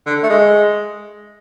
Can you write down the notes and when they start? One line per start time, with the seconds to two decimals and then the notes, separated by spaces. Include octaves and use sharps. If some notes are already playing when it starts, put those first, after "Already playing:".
0.06 D3
0.23 A3
0.30 G#3